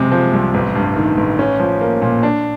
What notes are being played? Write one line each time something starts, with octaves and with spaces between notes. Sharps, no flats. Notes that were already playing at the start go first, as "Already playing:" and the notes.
Already playing: F#1 C3 G#3
F3
C2
A1
G2
D#3
A1
C#4
F3
A#3
A#2
D4